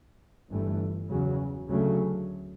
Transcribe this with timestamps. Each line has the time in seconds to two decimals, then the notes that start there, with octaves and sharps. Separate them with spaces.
0.49 G1 G2 E3 A3
1.09 E2 C#3 F#3
1.69 D2 C#3 F#3 A3